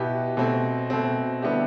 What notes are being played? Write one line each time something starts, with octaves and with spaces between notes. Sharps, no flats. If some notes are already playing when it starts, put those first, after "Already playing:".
Already playing: B2 B3 E4 G4
B2 A3 C4
B2 A3 C4
D3 G3 B3 E4 G4